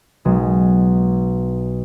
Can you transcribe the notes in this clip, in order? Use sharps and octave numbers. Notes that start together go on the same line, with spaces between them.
B1 G#3